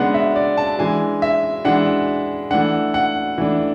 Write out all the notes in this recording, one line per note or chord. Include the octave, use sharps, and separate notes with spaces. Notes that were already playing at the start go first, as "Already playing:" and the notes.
Already playing: C#3 G#3 B3 D4 F#5
E5
D5
A5
E3 G#3 D4 G#5
E5
E3 G#3 D4 F#5
E3 A3 D4 F#5
F#5
E3 A3 D4